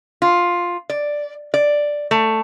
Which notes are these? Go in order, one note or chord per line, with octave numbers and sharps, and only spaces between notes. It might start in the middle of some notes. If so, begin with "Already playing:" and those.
F4
D5
D5
A3